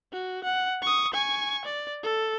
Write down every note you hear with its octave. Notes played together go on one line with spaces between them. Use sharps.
F#4
F#5
C#6 D#6
G#5 C#6
D5
A4